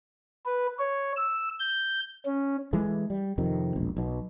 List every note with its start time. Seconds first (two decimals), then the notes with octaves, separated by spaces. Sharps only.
0.46 B4
0.79 C#5
1.16 E6
1.60 G6
2.26 C#4
2.73 E3 G#3 A3
3.10 G3
3.38 F2 C3 D#3
3.76 E1 A#1
3.97 B1 B2